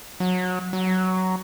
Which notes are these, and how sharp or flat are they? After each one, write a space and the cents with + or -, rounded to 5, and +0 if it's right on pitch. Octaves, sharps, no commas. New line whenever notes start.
F#3 -20
F#3 +10